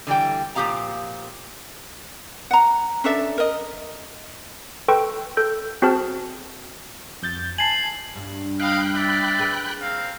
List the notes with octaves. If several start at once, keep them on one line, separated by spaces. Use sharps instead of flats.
D3 E3 G3 G5
A#2 F3 G4 G#4 F5 A#5
F#5 A#5
C#4 D4 A4 E5
A#4 D#5
A4 B4 G5 C6 C#6
A4 G6
C4 F#4 G#4 C5 A5 F6
F2 G6 A6
G#5 A5 C7 F#7
G2
D#5 F5 G5 B5 F#6
D5 E5
G#4 B4
C4 A#4 F5